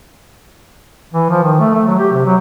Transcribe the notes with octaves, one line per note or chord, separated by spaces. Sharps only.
E3
F3
D#3
A3
A3
F#3
G4
C3
F#3